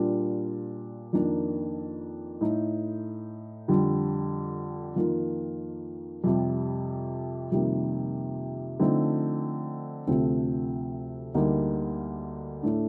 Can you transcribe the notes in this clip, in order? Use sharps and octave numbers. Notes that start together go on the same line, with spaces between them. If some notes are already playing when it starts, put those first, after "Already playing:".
Already playing: A#2 G3 D4 F4
F2 D#3 A#3 D4
A2 A3 D#4
F2 D3 G3
F2 D#3 A#3 F4
F2 C3 G3
F2 C3 D#3 G3 A#3
D3 F3 A3 C4 D#4
D2 C3 F3 A3 C4
D2 D3 G3 A#3 D#4
A2 A3 D4